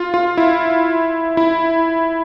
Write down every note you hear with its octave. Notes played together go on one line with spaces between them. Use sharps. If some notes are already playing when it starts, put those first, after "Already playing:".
Already playing: F4
F4
E4
E4